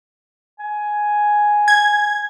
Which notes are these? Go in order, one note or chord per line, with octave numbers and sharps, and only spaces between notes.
G#5
G#6